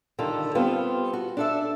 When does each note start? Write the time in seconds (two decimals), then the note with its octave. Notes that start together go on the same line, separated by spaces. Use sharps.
0.19 D3 D#3 G3 F4 A4
0.55 G3 B3 C4 F4 A4 B4
1.13 F#4
1.37 D4 A4 E5